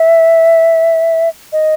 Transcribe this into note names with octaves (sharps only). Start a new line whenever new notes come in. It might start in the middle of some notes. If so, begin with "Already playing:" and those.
Already playing: E5
D#5